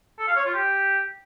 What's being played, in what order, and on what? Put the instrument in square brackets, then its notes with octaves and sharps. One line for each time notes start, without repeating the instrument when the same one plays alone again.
[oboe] A4
F5
C#5
F4
G4